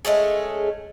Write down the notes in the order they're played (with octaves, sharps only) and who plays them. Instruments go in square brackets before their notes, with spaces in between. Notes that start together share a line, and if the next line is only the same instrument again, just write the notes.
[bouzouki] G#3 A3 C#4 G#4